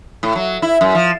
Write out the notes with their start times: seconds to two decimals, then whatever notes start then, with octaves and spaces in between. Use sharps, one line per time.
0.23 A2
0.35 F#3
0.62 E4
0.81 F#2
0.95 F3